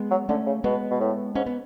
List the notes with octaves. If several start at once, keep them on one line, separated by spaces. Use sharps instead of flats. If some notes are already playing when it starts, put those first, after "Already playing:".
Already playing: G#3 B3
F#3
D3 A3 C#4
C#3
B2 G#3 B3
B2
A2
G#2 C#4
B3